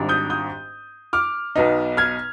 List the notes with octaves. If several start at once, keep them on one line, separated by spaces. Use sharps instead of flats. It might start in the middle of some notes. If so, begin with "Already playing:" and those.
Already playing: G#1 G#2 G3 D4
D#6 G6
D#6 G6
D6 F6
B1 B2 B3 D#4
F6 G#6